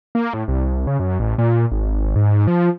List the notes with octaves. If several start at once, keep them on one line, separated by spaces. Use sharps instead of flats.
A#3
A2
C2
C#3
F#2
A1
A#2
G#1
G#2
F3